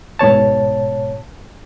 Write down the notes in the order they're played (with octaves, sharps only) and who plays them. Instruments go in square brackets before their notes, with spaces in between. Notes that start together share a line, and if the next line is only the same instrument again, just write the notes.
[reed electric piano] G#2 B2 C#5 A5